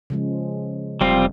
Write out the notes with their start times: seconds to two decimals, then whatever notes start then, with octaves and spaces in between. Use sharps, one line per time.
0.10 C#3 F3 G#3
1.01 F1 G3 C4 F4